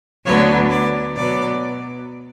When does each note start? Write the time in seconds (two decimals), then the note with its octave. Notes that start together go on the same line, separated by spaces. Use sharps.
0.25 D2 D3 F#3 B3 C#5
0.70 D5
1.16 B2 F#3 B3 D5